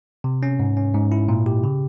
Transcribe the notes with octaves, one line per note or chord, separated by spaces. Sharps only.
C3
C#4
G#2
C#4
G#2
E4
A#2
G4
C#3